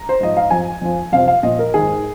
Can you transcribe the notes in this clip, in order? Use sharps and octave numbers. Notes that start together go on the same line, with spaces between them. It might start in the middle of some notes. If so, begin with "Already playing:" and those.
Already playing: A#5
C5
G#2 F3 D#5
F5
F2 F3 G#5
F2 F3
F2 C3 F3 F5
F5
A#2 F3 D#5
A#4
G#2 D#3 G#4